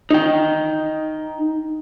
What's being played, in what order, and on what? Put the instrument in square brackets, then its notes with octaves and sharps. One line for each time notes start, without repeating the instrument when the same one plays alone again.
[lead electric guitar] D#4 G5